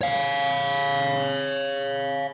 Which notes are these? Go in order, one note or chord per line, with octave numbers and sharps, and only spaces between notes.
C#5 F5